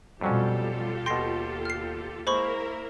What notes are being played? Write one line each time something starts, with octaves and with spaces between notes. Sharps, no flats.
F2 B2 F#3 G3 C#4 F4 G4 A4
D#2 B2 G5 C6 A#6 C7
F6 C7
G#3 A#3 E4 A#4 C5 B5 C#6